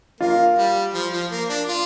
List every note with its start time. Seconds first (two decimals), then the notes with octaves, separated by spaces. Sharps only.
0.20 A#3 F4
0.58 G3
0.94 F3
1.13 F3
1.31 A#3
1.49 D4
1.68 F4